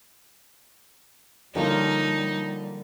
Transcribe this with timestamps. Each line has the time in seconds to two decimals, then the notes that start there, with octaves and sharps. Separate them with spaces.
1.55 D3 F3 G3 A#3 D#4 F4 G4 C#5